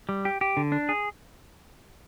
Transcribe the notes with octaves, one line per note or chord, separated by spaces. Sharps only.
G3
G4
G4
D3
D4
G#4